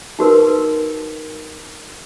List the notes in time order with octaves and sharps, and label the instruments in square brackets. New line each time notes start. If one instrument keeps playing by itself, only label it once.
[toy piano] D#4 F#4 A#4 B4